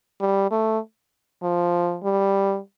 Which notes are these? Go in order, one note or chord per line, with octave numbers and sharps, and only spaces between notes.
G3
A3
F3
G3